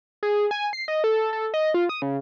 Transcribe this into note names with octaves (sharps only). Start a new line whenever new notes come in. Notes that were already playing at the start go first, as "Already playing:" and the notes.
G#4
G#5
C7
D#5
A4
A4
D#5
F4
D#6
C#3